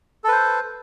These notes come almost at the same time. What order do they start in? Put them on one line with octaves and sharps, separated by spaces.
A4 B4 C5